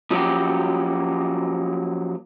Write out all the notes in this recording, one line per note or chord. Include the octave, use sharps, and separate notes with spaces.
F3 F#3 A#3 C#4 F#4 G4